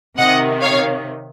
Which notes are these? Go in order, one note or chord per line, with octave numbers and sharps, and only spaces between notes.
C3 D#3 D#5 F#5
C#5 F5